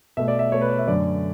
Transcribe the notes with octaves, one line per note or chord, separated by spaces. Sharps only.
B2 A3 E5
D5
E5
B2 A3 C#5
B4
C#5
E5
F#2 D3 A3 D5